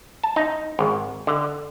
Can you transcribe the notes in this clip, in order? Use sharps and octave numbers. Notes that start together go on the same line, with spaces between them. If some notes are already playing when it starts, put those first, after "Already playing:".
A5
D#4
G#1
D3